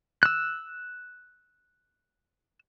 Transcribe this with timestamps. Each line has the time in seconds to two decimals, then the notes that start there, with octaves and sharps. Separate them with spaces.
0.23 E6 F#6